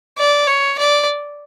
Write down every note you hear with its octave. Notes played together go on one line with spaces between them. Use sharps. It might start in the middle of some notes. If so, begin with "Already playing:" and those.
D5
C#5
D5